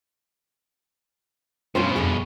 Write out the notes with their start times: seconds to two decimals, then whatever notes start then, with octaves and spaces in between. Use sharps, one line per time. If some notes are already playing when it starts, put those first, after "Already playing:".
1.75 G2 B2 C#4 F4 C5
1.96 F2 D3 G#4